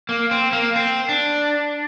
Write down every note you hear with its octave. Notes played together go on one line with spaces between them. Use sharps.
A#3
C4
A#3
C4
D4